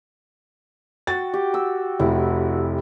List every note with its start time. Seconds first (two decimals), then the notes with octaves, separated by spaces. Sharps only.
1.07 F#4 G5 A6
1.34 G4
1.54 E6
2.00 F1 E4